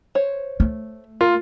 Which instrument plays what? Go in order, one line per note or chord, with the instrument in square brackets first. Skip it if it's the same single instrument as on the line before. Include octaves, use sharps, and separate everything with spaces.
[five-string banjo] C5 C#5
[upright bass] A3
[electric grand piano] F4 [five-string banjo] A#4